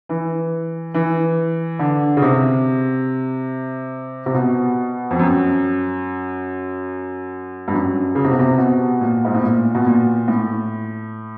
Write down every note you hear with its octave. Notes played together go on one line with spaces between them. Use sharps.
E3
E3
D3
C#3
C3
C3
B2
F2
F#2
G2
F#2
C#3
C3
B2
C3
B2
A#2
G#2
A2
A#2
B2
A#2
A2